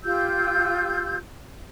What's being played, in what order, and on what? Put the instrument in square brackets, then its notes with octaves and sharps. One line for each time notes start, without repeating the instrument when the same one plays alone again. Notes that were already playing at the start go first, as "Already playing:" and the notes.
[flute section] F4 G4 E6 G6